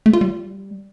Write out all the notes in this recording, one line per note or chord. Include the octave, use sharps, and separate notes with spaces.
A3
F4
G3